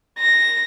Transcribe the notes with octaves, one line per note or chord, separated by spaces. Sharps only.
A#6